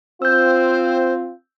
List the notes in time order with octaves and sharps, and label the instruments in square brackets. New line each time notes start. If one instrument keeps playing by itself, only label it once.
[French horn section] C4 F4 [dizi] C5 [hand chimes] E6 G6